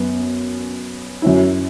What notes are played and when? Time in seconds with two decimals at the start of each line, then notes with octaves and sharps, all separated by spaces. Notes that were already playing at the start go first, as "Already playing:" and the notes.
Already playing: F#2 B3
1.22 F#2 F#3 C#4 E4